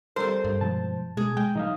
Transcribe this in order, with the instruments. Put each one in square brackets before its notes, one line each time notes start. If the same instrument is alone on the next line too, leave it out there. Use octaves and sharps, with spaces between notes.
[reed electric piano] G3 A4 A#4 [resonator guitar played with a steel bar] C4 C5
[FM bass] G2
[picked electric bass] B2 F3 G#3 [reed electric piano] A5
[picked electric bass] B2 [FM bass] G#3 [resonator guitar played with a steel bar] G#4
[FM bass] G#3 [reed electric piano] G5
[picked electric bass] A#2 E3 F#3 [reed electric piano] D#4 D#5 F5